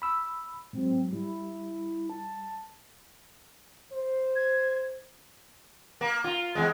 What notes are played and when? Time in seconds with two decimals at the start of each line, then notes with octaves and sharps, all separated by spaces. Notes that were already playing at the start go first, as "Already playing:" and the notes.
0.02 B5 E6
0.73 G#2 F#3 C4
1.13 G3 E4
2.10 A5
3.93 C5
4.36 G#6
6.01 A#3
6.24 F4
6.55 E2 G#3